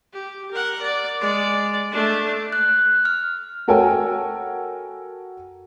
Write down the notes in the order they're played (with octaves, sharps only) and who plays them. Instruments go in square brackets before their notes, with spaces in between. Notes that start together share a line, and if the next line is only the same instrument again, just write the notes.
[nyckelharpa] G4
A#4 F#5
D5
G#3 D5
A3 D4
[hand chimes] F#6
F6
[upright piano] F#4 A4 A#4 C#5 G5 G#5